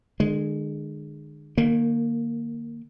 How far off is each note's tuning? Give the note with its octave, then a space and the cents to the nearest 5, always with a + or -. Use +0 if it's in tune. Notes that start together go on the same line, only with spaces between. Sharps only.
D3 +45 G#3 +0
D#3 -25 A#3 +0